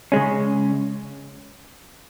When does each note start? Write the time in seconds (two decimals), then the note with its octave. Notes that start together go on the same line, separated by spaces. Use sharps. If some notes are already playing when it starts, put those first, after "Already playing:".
0.12 C#3 G#3 C#4